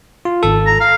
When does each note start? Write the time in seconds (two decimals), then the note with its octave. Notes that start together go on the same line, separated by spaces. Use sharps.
0.25 F4
0.43 G#1 A4
0.67 A#5
0.80 F5